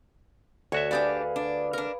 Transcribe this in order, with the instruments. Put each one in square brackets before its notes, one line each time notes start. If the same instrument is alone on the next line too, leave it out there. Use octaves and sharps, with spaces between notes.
[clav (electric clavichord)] D2 F#4 E5 [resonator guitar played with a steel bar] C#5
[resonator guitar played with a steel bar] D4 G4 D5 [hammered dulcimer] G#4 B4 F5
[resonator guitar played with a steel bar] D4
D4 A#4